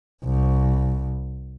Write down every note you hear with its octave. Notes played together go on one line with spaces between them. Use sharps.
C2